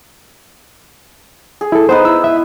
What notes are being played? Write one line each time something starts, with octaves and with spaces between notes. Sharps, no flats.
G#4
E4 A4
B3 D#4 B4 C5
E4 E6
E5